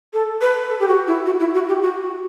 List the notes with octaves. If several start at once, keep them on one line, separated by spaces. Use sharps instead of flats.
A4
B4
A4
G4
F#4
E4
F#4
E4
F#4
G4
F#4